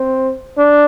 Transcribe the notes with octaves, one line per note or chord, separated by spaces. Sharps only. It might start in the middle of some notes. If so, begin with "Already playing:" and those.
Already playing: C4
D4